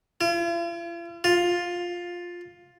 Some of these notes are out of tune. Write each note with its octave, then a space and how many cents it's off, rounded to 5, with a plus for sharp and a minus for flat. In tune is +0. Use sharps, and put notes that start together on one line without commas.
F4 -45
F4 +10